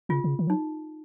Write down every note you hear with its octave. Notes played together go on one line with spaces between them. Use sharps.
C#3 F4
C#3
D#3
F#3 D#4